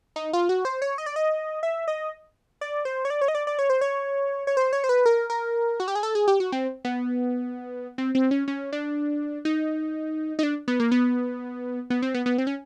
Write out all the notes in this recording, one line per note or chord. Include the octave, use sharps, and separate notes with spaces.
D#4
F4
F#4
C5
C#5
D#5
D5
D#5
E5
D#5
D5
C5
C#5
D5
C#5
D#5
D5
D5
C#5
C5
C#5
C#5
C5
C#5
C5
B4
A#4
A#4
F#4
G4
G#4
A4
G#4
G4
F#4
C4
B3
C4
C4
C#4
C#4
D4
D#4
D#4
D4
B3
A#3
B3
B3
C4
B3
B3
C4
C#4